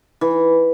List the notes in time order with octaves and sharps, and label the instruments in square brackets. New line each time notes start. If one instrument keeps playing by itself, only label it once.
[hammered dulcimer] E3